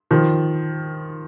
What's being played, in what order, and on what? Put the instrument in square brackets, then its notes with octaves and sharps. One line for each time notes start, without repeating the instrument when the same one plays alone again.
[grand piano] D#3 F3